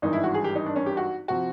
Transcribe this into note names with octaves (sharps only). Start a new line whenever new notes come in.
G#1 G2 E3 D#4
E4
F#4
G#4
G4
D#4
D4
C#4
G4
F#4
C3 F3 F#4